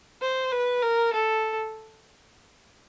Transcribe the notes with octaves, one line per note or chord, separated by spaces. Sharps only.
C5
B4
A#4
A4